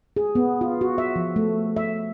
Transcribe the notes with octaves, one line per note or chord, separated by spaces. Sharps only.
G#4
B3
F4
F#4
E5
F3
A3
E5